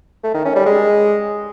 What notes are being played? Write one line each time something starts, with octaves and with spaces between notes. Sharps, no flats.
A3
D#3
C#4
G3
G#3